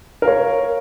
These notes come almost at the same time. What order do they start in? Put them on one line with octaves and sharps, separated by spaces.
A#4 F5 C#5